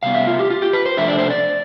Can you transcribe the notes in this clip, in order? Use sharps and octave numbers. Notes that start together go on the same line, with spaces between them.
C3 G3 B3 F5
E5
F4
G4
F4
G4
B4
C5
C3 F3 A3 D4 E5
D5
C5
D5